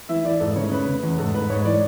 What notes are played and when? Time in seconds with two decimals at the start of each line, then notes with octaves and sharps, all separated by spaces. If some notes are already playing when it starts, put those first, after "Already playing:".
0.09 E3 E5
0.25 E3 D5
0.40 G#2 A4
0.56 C#3 C#5
0.72 C#3 B4
0.88 C#3
1.03 E2
1.18 G#2 A4
1.34 G#2 B4
1.50 G#2 C#5
1.65 E3 D5